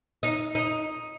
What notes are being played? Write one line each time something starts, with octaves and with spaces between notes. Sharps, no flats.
D#4
D#4